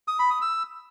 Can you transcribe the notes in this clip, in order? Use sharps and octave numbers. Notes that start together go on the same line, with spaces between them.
D#6
B5
D#6
E6